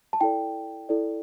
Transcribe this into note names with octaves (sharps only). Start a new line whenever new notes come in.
A5
E4 A4 D5 G5
E4 A4 D5